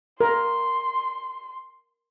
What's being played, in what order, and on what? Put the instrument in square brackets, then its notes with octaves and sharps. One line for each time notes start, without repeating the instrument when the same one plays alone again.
[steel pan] A#4 [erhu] C6